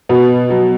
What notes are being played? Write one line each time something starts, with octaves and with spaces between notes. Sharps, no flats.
B2 B3
F#3